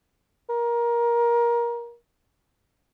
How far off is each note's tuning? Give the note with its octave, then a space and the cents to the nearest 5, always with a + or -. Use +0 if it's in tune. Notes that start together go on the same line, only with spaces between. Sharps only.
A#4 +20